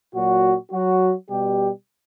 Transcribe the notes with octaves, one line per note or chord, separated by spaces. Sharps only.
A#2 F#3 F#4
F#3 F#4
B2 G3 G4